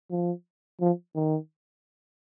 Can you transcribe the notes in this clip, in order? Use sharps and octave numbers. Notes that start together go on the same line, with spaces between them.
F3
F3
D#3